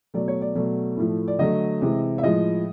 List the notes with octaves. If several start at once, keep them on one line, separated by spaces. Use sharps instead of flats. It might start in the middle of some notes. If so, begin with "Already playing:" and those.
B2 F#3 A3 D5
C#5
D5
B2 F#3 A3 D5
A2 F3 A3
D5
D3 F#3 A3 D#5
C3 E3 G#3
E5
A2 F3 G#3 D#5